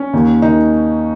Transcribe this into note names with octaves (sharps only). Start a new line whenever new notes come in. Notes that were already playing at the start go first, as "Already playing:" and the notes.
Already playing: C#4
D#2 D#3
D#3 D#4